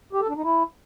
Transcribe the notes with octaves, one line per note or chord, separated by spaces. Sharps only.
G4
A4
D4
D#4
E4